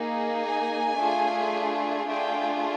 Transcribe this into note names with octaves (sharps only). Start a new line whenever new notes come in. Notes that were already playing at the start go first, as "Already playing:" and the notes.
Already playing: A#3 D#4 G#4
G#5
A3 D4 F4 G#4
A3 D4 F4 G#4 G5